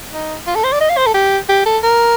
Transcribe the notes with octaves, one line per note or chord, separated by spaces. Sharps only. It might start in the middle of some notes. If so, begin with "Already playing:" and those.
D#4
F4
A4
C5
D5
D#5
F5
C5
A4
G4
G4
A4
A#4